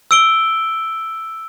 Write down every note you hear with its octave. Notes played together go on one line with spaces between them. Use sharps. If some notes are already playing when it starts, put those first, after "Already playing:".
E6 D7 G7